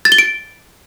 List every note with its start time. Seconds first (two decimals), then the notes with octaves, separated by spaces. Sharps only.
0.05 A6
0.12 G7
0.18 D7